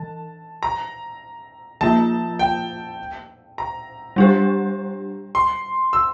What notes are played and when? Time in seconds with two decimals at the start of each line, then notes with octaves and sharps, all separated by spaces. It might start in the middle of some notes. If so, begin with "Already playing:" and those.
Already playing: E3 A5
0.63 A#5
1.81 F3 A#3 F4 A5
2.39 G5
3.58 A#5
4.16 G3 D4 G4
5.35 C6
5.93 E6